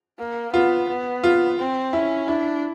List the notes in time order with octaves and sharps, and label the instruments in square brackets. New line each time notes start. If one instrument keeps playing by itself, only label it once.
[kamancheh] A#3
[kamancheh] B3 [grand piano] F4
[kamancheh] B3
[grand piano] F4
[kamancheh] C4
[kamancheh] C#4 [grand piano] E4
[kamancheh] D4 [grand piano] E4